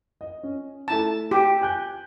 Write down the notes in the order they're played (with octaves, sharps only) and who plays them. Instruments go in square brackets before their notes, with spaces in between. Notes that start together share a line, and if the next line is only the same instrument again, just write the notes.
[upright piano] D#5
C#4
[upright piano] A3 E4 A#5 [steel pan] A5
[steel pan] G4
[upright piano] G#5 F#6 G6